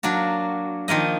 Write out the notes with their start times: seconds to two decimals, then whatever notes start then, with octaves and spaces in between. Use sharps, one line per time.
0.03 F#3 A#3 D4 F#4
0.88 D#3 F3 A#3 D#5